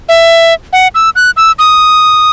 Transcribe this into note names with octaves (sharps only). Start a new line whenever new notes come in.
E5
F#5
E6
F#6
E6
D#6